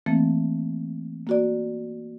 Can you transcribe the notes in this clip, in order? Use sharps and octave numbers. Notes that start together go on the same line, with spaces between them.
E3 F3 A3 A#3 C4
A#3 F#4 D5